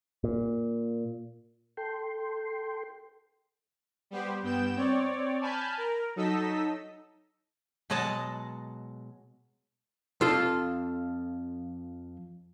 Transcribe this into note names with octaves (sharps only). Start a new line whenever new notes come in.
A#2
A4 G5 C6
G3 B3 G4 C5
G2 B3 G5 G6 E7
C4 C#5 D5
G#5 A5 B5 F6 G6
A#4
F#3 D#4 A4 D#5 E6 B6
B2 F#3 G#3 D#5 F#5 A5
F2 F4 A4